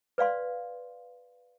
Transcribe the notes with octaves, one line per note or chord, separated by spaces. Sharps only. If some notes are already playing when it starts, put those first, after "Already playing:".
B4 D5 F5 C6